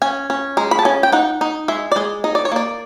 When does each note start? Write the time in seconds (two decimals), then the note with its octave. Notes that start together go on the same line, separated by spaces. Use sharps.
0.02 C#4 G#5
0.30 C#4
0.57 G#3 A#5
0.71 B5
0.79 A5
0.85 C#4 G#5
1.03 G5
1.12 D#4 F#5
1.41 D#4
1.68 G#3 E5
1.92 D5
1.96 G#3 D#5
2.24 D#4 D#5
2.35 D5
2.45 C#5
2.52 A#3 D5